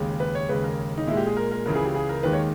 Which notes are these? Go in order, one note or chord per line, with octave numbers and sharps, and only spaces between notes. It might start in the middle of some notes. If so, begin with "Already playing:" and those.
Already playing: D#2 C#3 G#3
B4
C#5
D#2 C#3 G#3 B4
A#4
D#4
A#2 G#3 E4
G4
G#4
A#4
A#4
C#2 C#3 E3 A#4
G#4
G4
G#4
A#4
D#2 D#3 G#3 B4
C#5